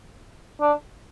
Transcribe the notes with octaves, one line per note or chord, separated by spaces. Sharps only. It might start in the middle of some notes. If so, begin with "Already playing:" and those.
D4